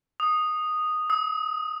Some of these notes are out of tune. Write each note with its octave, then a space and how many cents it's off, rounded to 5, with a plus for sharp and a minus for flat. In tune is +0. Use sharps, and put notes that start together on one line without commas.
D#6 -5
D#6 +45